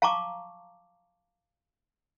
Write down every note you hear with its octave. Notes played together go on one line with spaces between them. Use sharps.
F5 A5 A#5 C#6 D6